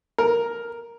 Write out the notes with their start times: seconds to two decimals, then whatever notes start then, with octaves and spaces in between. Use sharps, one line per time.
0.18 A#4